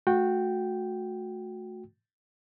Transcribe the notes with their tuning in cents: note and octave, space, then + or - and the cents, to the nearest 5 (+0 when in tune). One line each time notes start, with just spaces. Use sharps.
A3 -15 F#4 -20 G5 -5